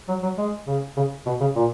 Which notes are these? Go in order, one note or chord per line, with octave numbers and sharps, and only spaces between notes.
F#3
F#3
G#3
C#3
C#3
B2
C#3
A#2